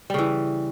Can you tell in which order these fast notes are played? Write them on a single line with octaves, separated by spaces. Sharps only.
G3 C#3 E3